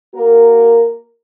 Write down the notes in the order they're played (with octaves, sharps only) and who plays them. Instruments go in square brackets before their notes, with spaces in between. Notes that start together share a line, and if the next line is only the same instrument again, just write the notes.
[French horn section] A#3 F#4 A#4